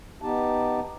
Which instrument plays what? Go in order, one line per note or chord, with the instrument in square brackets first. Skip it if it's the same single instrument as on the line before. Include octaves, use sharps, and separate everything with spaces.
[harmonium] B3 D#4 G4 A5